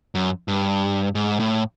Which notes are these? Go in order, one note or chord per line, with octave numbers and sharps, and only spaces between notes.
F#2
G2
G#2
A2